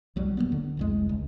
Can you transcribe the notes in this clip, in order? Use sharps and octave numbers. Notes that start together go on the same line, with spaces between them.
C2 F#3 G3
E1 G2 A#3 B3
D3
F1 C2 G#3
C#2